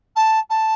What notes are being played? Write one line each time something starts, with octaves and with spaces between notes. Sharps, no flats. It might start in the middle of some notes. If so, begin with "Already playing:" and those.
A5
A5